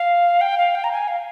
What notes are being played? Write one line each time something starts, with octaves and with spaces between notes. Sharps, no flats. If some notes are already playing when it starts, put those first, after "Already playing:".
Already playing: F5
G5
F5
G5
A#5
G#5
F5